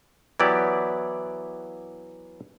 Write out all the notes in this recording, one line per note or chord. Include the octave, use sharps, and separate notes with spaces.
E3 F#3 B3 E4 G4 D5